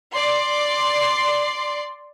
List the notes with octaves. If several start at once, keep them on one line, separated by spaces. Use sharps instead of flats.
D5 C6